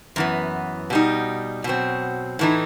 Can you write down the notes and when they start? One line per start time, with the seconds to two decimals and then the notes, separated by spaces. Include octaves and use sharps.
0.16 F#2 E3 B3
0.90 B2 G3 D#4
1.64 B2 F#3 C4
2.39 A2 E3 A3 D#4